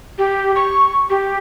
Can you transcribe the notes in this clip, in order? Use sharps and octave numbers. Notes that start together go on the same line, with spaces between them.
G4
C#6
G4